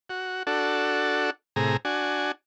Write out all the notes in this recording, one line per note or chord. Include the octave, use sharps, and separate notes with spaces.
F#4
D4 F#4 A4
A2 C3 G#4 A#5
D4 F#4 G#5